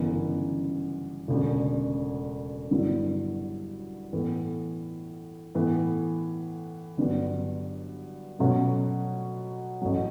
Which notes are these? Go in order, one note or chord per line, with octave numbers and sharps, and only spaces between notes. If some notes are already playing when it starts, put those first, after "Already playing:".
Already playing: G1 F#2 C#3 E3 B3
E1 D2 C#3
G1 G2 F#3 B3 E4
A2 E3 B3
A2 E3 B3
G1 G2 F#3 B3
B2 F#3 A3 C#4
A1 A2 F#3